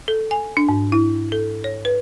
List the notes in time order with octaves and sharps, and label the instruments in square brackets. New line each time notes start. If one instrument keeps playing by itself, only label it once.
[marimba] A4
G#5
D4
G#2
E4
A4
C#5
B4